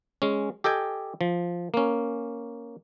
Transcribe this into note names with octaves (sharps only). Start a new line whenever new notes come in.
G#3 C#4
G4 A4 D#5 G5 G#5
F3
A#3 C#4